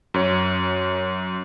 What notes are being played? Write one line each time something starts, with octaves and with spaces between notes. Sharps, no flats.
F#2 C#5